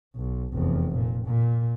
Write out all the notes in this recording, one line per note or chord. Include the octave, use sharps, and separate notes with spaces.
B1
F1 E2
A#2
A#2